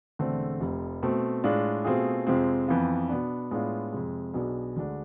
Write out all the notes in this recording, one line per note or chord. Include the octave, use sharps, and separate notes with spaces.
E1 E2 D3 A3 C4
F1 F2 C3
B2 A3 C4
A2 G#3 D4 F4
B2 A3 C4 F4 G#4
F2 C3 F3 G#3 C4
F2 E3 B3 F4
B2 B3 D4
A2 G#3 B3 D4 F4
F2 C3 G#3
B1 B2 B3 D4 G#4
D2 D3 G#3 D4